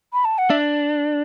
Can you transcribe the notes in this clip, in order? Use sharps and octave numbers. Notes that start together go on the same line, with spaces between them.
B5
A5
F#5
D4 E5